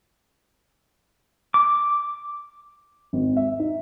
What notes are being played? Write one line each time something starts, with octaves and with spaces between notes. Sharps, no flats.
D6
G#1
E5
D#4